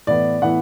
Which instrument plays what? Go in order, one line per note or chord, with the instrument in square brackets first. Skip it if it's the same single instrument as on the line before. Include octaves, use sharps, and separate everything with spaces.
[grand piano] A2 E3 B3 D5
A2 E3 B3 F#5